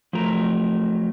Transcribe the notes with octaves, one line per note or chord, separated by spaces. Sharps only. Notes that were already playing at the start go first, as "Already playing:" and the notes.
F3 F#3 A3 A#4 A#5